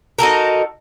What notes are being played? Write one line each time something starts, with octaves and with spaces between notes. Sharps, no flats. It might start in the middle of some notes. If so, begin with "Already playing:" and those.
D#4 F#4 A4 A#4